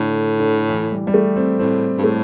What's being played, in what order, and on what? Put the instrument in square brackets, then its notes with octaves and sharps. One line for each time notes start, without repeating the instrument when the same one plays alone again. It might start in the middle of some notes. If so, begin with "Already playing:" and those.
Already playing: [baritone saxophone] A2 [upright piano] D3
[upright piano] D3
E3
G3
G3
A3
C4
[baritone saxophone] A2 [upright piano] C4
[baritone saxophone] G2
[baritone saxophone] A2 [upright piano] A3